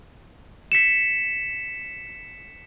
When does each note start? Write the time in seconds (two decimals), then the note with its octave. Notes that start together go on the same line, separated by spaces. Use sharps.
0.72 B6 C#7 E7